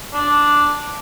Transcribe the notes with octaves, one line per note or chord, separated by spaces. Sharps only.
D4